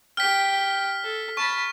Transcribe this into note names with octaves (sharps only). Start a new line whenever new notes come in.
G4 G5 F6 B6
A4
A5 B5 C#6